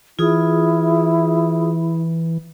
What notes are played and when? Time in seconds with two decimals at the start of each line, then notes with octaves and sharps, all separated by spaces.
0.19 E3 E4 F4 G#4 D#6